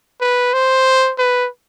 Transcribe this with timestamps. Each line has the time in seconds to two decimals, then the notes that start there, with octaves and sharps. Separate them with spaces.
0.21 B4
0.53 C5
1.18 B4